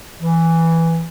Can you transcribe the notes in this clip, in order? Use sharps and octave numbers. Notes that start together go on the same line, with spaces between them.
E3